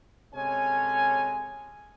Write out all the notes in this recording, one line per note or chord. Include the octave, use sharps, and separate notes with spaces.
C3 G#3 C#4 A4 C#5 G#5